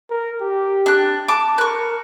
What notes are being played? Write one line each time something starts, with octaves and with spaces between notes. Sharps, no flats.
A#4
G4
D4 F#6
A5 D6
A#4 C#6 F#6